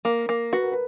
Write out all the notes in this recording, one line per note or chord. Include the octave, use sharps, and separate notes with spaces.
A#3 A#4
A#3
F#4 B4
A#4
B4